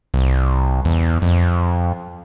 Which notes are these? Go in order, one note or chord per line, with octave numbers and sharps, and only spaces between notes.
C2
E2
F2